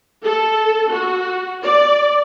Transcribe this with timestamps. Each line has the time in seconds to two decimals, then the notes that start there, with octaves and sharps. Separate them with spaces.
0.25 A4
0.91 F#4
1.63 D5